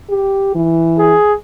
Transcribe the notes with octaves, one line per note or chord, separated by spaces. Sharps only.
G4
E3
G#4